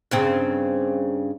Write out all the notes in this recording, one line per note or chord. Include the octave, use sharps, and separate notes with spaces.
G2 C#3 C4